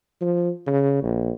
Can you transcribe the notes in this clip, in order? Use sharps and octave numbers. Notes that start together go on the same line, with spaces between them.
F3
C#3
A#1